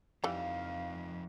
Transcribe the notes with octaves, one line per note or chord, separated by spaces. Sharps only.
F2 E3 F3 G3 D#4 F5